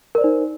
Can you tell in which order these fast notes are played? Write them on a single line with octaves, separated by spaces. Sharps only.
A#4 D5 C5 D#4